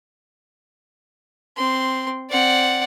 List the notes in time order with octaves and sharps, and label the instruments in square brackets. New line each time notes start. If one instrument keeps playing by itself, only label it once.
[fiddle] C4 C6
[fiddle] C4 [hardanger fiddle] D5 F#5